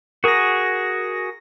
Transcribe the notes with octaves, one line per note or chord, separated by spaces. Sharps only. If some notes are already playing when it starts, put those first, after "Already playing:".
F#4 G#4 A#4 A#6